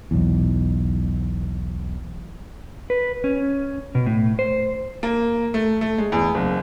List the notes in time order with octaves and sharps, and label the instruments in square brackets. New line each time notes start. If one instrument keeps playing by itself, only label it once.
[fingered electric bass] B1 E2
[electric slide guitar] B4
C#4
B2
A2
C5
[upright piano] A#3
A3
A3
G#3
E2
F#1